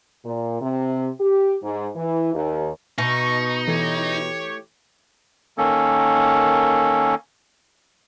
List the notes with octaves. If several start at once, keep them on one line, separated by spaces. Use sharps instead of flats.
A#2
C3
G4
G#2
E3
D#2
B2 D#4 C#6
E3 A3 G4 C#5
D#3 A#3 C#4 A4